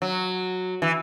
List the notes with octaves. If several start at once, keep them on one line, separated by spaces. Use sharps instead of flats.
F#3
E3